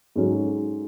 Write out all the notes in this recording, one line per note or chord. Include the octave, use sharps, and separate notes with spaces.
G#2 F#3 C#4 F#4 A4